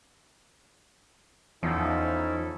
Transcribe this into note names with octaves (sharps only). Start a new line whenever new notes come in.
E2 F3 C#4 D#4 E4 A4